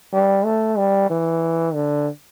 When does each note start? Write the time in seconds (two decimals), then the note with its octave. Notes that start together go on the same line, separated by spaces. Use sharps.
0.13 G3
0.45 A3
0.78 G3
1.10 E3
1.74 D3